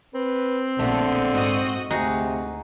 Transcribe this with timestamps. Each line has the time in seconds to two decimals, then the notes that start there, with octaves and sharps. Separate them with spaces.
0.15 C4 B4
0.79 A#1 D3 A3 B3
1.31 G#2 F#4 D#5
1.91 D2 C3 D#4 F#4 G#4